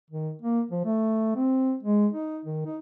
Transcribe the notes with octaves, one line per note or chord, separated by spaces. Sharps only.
D#3
A#3
F3
A3
C4
G#3
D#4
D#3
D#4